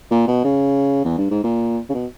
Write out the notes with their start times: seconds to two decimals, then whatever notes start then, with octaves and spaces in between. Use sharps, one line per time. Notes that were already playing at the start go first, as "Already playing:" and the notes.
0.11 A#2
0.28 B2
0.44 C#3
1.05 E2
1.18 G2
1.30 G#2
1.44 A#2
1.89 C#3
1.94 B2